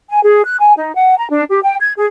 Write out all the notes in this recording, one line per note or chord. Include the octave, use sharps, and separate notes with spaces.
G#5
G#4
F#6
G#5
D#4
F#5
A#5
D4
G4
G5
G#6
G#4